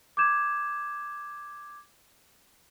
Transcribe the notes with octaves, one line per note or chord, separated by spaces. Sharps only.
D6 G6 G#6 E7